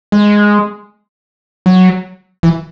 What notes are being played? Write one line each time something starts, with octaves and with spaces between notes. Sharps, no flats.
G#3
F#3
E3